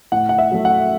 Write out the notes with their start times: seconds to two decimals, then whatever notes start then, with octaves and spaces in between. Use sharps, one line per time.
0.12 A2 F#5
0.29 F#5
0.38 E5
0.52 F#3 A3
0.65 F#5